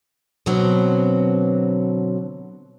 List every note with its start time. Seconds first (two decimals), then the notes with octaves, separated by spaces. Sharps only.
0.46 B2 D3 F#3 C4